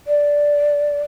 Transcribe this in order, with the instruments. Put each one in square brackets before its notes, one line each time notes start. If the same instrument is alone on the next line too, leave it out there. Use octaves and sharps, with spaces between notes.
[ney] D5